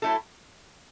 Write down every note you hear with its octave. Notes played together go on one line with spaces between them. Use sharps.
F#3 A3 E4 A4